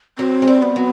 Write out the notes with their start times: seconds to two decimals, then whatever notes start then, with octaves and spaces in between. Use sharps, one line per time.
0.18 F#3 C4
0.42 G#3
0.47 G3
0.62 B3
0.76 F#3